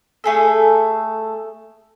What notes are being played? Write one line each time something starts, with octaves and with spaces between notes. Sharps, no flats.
A3 G#4 A4